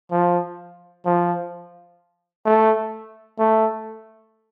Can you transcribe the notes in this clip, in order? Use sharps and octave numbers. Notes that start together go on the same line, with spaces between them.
F3
F3
A3
A3